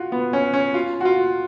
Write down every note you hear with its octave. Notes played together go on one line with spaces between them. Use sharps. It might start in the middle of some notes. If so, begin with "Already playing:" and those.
Already playing: F4 F#4
B3
C#4
C#4
F4
F#4
F4